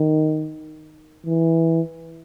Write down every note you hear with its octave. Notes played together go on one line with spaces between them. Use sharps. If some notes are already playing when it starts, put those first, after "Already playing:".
Already playing: D#3
E3